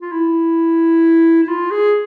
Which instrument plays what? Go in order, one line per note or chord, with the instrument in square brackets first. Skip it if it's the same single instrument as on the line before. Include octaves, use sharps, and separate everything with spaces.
[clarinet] F4
E4
E4
F4
G#4